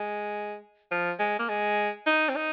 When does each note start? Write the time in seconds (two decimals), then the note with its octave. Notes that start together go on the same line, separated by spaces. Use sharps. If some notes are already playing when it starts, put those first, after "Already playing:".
Already playing: G#3
0.91 F3
1.19 G#3
1.39 A#3
1.49 G#3
2.06 D#4
2.29 C4
2.36 D#4